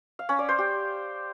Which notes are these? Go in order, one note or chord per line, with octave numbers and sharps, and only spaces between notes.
F5
C#4
D5
C5
G4